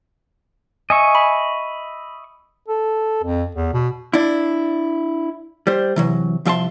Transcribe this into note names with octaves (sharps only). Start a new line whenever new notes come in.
D#5 E5 G#5 C#6
B5
A4
F2
E2
B2
D4 E4
G3 C5
C3 E3 F#3
C2 F3 E5 G5 A5 C6